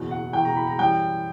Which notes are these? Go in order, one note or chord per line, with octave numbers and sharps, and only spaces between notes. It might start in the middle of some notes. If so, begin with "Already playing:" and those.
Already playing: F#1 E2 B2
F#5
F#1 E2 B2 G5
A#5
B5
A#5
F#2 E3 G3 G5